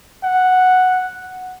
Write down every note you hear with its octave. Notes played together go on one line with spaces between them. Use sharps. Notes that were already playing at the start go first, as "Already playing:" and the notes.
F#5